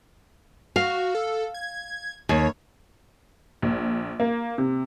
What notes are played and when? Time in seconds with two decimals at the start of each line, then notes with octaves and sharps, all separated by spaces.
0.76 F#4 F5
1.15 A4
1.54 G#6
2.29 D#2 C#5
3.62 A#1
4.20 A#3
4.58 C3